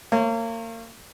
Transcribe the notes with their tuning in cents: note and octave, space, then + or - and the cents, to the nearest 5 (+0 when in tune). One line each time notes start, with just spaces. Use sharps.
A#3 -35 C#5 -25